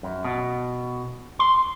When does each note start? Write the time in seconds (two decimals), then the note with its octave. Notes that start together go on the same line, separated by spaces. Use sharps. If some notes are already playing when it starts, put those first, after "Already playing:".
0.03 F#2
0.24 B2
1.39 C6